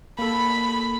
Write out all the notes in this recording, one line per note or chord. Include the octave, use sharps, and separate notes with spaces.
A#3 A4 B5